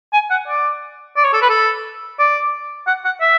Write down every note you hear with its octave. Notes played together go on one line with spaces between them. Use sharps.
G#5
F#5
D5
D5
C#5
A4
B4
A4
D5
F#5
F#5
E5